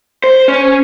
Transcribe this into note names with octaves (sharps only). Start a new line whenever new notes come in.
C5
C#4